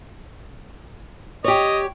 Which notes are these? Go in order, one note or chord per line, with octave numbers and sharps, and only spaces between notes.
G4 C#5 D#5